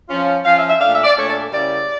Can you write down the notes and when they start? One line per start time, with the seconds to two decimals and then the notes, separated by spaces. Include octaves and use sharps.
0.08 F3 C#4 F4
0.44 F3 C#4 F4 F5
0.56 E5
0.68 E5
0.80 A#2 A3 D4 F5
0.92 E5
1.04 D5
1.16 A#2 A3 D4 C#5
1.28 A4
1.51 C#3 G3 A#3 C#4 E4 D5